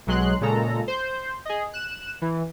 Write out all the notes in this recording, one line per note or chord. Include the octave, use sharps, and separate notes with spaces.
B1 F#3 G#3 C6 F#6
A#2 C#3 G#3 A4 A#5
C5 G6
G#4 D#5
F#6 E7
E3